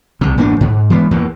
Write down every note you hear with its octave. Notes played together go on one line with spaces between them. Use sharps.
C2 C3
G#1 E2 A#3 D4
G#2
E3 G#3 B3
E2 E3 A#3